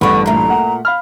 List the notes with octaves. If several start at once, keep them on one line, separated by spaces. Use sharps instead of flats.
A1 G2 D3 B3 B5 C#6
A#2 A3 A#5
F#5
F5 B5 F6